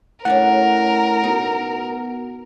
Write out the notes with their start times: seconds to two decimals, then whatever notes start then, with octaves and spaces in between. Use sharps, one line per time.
0.25 A2 A3 C#4 D4 A#4 F#5
1.24 B2 D#4